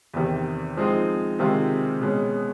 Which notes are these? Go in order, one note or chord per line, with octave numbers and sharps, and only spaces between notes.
E2 C3 D#3
F3 G#3 C4 D#4
C3 D#3 G#3 C4 F4
B2 G#3 C#4